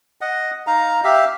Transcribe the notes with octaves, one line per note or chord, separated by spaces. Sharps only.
D#5 F#5
D#4 F5 A#5
G4 E5 F5